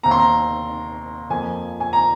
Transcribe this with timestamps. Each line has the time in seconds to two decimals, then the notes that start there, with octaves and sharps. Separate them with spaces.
0.03 D#2 D#3 C4 A#5
0.11 C6
0.20 A#5
1.30 F2 F3 A#3 G#5
1.80 G#5
1.93 A#5